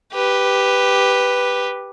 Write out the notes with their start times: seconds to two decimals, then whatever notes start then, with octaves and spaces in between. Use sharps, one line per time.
0.13 G4 B4